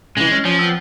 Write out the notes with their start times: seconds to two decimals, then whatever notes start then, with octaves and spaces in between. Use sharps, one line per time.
0.17 C#3 E3 G#3
0.32 C#4
0.45 F3 C#4
0.59 B3 C4 E6